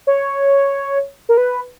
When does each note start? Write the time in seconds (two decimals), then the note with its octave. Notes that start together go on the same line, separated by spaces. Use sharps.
0.07 C#5
1.29 A#4
1.37 B4